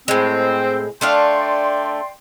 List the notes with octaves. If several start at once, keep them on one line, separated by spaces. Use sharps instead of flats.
A2 G#3 C4 C5
A3 D4 D5 F5 G5 C6